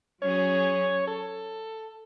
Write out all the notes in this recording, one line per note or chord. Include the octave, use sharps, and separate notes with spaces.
F#3 C#4 G#4 C#5
A4